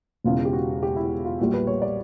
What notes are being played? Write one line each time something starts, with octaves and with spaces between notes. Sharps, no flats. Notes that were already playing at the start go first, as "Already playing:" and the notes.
E1 E2 C#3 F4
G4
F#4
G4
E4
F4
A#1 A#2 G3 F#4
B4
C#5
D5